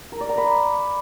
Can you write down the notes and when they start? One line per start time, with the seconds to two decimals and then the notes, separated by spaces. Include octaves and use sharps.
0.12 A#4
0.20 D5
0.29 A#5
0.38 B5